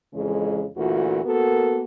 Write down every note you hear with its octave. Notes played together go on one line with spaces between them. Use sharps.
F2 C#3 E3 G#3
D2 A#2 E3 F4 F#4
A#3 B3 F#4 A4 A#4